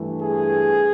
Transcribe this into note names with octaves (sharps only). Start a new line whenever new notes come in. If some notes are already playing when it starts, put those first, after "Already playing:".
Already playing: G2 E3 A3
G#4